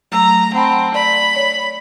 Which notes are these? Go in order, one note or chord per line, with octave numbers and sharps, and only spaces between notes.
F#3 A3 A#5 E6
C4 F#5 A5 B5
D5 B5
C#5